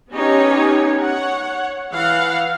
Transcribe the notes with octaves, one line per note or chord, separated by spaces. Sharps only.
B3 C#4 D#4 G4 C#5
C#5 F#5
E3 F5 F#5